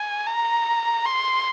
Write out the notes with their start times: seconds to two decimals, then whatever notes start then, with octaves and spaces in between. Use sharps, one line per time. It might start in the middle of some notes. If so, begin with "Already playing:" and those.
Already playing: G#5
0.27 A#5
1.06 C6